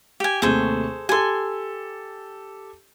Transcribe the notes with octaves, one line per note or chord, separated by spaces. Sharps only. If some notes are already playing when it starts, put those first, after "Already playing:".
G4 G#5
D#2 C3 A3 G#4 A4 C5
G4 A4 G#5 C6